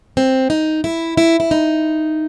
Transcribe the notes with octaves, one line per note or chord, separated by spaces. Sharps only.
C4
D#4
E4
E4
E4
D#4